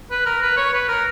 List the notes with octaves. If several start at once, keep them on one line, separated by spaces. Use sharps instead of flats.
B4
A#4
B4
C#5
B4
A#4